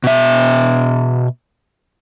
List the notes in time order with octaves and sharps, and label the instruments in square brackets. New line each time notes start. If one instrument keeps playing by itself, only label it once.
[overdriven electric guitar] B2 E5